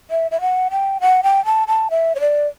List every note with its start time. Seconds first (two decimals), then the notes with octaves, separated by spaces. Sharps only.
0.11 E5
0.31 E5
0.41 F#5
0.71 G5
1.01 F#5
1.23 G5
1.45 A5
1.68 A5
1.91 E5
2.15 C#5
2.20 D5